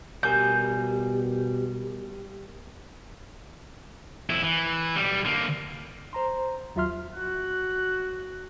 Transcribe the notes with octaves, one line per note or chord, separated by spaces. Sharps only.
B2 G3 G4 A#4 G#5 G6
F2 E4
E3
B1 G3
D3 A#3
C5 A#5 C6
D#2 F#3 F4 E5 C6 F6
F#4 F#6